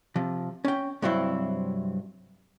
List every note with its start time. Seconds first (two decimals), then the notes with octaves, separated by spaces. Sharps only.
0.16 C3 F3
0.65 C#4 G5
1.02 G2 C3 F#3 C4 E4